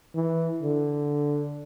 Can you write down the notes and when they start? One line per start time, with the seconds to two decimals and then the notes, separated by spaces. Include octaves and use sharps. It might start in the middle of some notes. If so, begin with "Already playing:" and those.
0.15 E3
0.63 D3